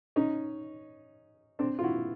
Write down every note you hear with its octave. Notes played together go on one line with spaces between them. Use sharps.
C#4 D#4
C4 D4
F4
E4 F#4